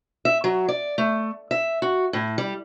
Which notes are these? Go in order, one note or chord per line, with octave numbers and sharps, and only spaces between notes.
E5
F#3
D5
A3
E5
F#4
A2
G3